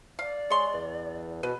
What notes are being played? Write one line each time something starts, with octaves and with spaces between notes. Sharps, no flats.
D5 F5
G#3 C#5 C6
E2
B2 B4